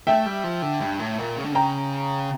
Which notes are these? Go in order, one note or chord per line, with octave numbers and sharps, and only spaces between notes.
A3 E5 G5
G3
F3
D3
G2
A2
A#2
C#3
D3
C#3 G5 A#5